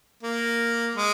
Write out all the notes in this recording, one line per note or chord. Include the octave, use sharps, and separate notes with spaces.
A#3
G#3